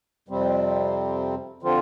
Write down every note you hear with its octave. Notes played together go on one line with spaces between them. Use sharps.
F2 C3 G3 C4
D3 F3 C4 F4